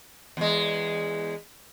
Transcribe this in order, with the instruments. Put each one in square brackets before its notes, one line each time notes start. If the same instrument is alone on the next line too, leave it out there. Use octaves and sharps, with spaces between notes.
[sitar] E2 G#3